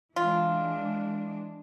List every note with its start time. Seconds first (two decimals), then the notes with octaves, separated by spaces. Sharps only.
0.16 E3 G#3 D4 F4